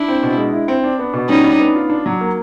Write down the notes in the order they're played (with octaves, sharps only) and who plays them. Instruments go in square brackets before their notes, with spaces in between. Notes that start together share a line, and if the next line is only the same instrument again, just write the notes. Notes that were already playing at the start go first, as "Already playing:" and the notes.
Already playing: [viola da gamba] D4 E4
[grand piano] C4
B2
G#3
E4
C4
D4
B3
B2
[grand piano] G3 [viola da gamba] C#4 D#4
[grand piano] D4
B3
F4
D4
F#3
A#3